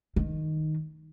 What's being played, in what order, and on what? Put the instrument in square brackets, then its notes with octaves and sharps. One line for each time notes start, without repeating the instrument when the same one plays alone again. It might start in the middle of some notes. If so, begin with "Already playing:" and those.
[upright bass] D#3